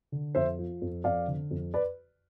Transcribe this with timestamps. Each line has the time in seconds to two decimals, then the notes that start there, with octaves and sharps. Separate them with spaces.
0.12 D3
0.35 F2 C5 E5
0.59 F3
0.82 F2
1.04 F2 D5 F5
1.28 D3
1.51 F2
1.74 B4 D5